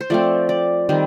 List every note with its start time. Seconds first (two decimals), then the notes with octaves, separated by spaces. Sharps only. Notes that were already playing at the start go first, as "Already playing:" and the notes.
0.01 C5
0.10 F3 A3 C4 D5
0.49 D5
0.89 D#3 G3 C4